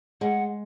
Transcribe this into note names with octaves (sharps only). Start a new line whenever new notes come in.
G#3 F#5